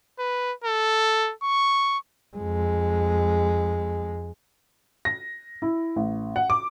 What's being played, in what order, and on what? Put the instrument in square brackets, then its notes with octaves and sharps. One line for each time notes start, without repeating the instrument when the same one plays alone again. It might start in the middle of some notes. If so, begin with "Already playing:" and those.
[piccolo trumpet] B4
A4
C#6
[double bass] F2 G#3
[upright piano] A#6
E4
A1
F#5
D6